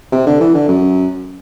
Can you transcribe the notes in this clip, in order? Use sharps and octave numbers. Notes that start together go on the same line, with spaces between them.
C3
D3
E3
D3
F#2